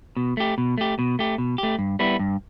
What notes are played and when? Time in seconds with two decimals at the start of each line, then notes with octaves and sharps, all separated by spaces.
0.17 B2
0.37 A3 G4
0.58 B2
0.78 A3 G4
0.99 B2
1.19 A3 G4
1.38 B2
1.58 A3 G4
1.79 G2
1.99 G3 B3 E4
2.19 G2